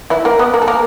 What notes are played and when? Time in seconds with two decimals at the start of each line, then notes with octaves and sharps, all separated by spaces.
0.10 E3 E4
0.25 A#3 A#4
0.39 B3 B4
0.54 A#3 A#4
0.62 A4
0.68 A#3 A#4